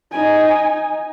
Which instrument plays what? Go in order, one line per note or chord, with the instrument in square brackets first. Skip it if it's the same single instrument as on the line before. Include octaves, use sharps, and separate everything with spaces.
[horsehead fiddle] D#4 G#5